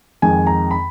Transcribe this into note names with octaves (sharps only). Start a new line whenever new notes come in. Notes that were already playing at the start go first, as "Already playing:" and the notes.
F2 D#3 G#3 G#5
A#5
B5